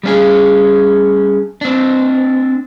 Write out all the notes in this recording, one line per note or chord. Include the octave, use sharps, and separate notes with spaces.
G3 C#4 G#4
C4 D4